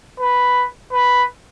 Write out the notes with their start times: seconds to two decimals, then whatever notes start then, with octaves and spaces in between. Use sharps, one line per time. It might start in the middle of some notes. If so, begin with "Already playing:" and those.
0.20 B4
0.93 B4